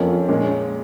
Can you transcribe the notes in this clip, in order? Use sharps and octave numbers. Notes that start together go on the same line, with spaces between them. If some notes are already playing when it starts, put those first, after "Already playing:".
Already playing: F2 F3 A#3 C#4
A#2 G#3 C#4